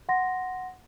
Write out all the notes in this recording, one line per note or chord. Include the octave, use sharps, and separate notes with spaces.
F#5 C6 A#6